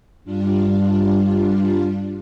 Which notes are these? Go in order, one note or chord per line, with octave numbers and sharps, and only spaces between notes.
G2 G3 D4 F4